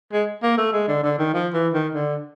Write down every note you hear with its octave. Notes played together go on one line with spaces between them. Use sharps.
G#3
A#3
A3
G#3
D3
D3
D#3
F3
E3
D#3
D3